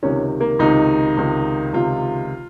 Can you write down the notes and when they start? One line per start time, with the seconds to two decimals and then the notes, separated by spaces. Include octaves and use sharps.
0.03 C#2 C3 D#3 C#4
0.40 A#3
0.59 C#2 C3 D#3 D#4
1.17 C#2 C3 D#3
1.73 C#2 C3 D#3 F4